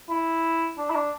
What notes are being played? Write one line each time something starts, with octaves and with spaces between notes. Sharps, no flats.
E4
D4
E4
D4